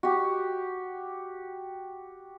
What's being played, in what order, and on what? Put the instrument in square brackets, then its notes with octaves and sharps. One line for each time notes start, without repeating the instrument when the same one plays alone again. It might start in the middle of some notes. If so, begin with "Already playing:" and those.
[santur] F#4 G4